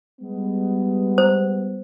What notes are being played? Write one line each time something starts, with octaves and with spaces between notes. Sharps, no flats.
G3 G#3 B3
C5